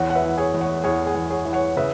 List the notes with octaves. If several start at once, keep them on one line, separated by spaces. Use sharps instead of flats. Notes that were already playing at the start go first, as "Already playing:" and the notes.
Already playing: E2 C#5 F#5
F#5
B4 E5
E3
G#4 C#5
E2
C#5 F#5
E2 G#4 C#5
G#4
E2
G#4 C#5
E3
C#5 F#5
C#3 B4 E5